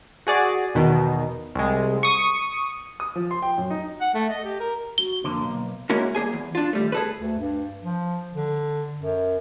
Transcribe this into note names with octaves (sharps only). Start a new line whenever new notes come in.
F#4 G#4 D5
E2 B2 D#3
C2 G#3
C#6 D#6
D#6
F3
C6
G5
F#2
D#4
F#5
A3
D#5
G4
A#4
F#4 G7
F2 D3 A#3
B1
G#3 A#3 C#4 E4 F#4 A#4
G2 A#3 G#4 G#5
E2
D4 F4
D#2 G3 A3
G#4 A4 B4
D2
G2
F3
D3
F#2